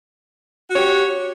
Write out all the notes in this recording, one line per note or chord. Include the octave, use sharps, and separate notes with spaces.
F#4 G4 C#5